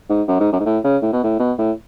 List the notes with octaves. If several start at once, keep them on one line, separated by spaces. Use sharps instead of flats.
G#2
F#2
G#2
F#2
G#2
A2
C#3
A2
B2
A2
B2
A2